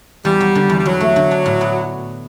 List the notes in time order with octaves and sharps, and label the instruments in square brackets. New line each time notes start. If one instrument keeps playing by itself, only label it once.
[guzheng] E2 [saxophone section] G3
[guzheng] F#3
D3
E2
[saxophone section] G3
[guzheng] E2 [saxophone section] F#3
[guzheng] A3
D3
D4
A2
B3